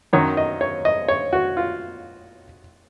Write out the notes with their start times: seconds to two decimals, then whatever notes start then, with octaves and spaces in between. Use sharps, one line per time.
0.13 F#2 D#3 F#3 C#5
0.37 D#5
0.61 C#5
0.85 D#5
1.08 C#5
1.33 F#4
1.57 F4